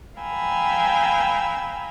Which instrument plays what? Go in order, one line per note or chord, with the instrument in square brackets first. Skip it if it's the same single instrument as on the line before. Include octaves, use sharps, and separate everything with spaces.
[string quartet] F5 G5 G#5 A#5 B5 E6